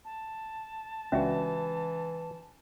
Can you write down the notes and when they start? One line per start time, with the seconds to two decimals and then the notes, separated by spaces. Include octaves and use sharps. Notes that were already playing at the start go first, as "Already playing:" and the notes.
0.05 A5
1.12 C#2 E3 C#4 D4 F#4 E5